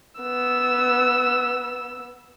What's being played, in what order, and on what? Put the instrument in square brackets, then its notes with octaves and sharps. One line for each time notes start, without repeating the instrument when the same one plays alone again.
[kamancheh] B3 E6